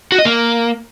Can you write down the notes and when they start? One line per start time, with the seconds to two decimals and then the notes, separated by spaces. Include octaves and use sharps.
0.12 F#4
0.19 D#5
0.25 A#3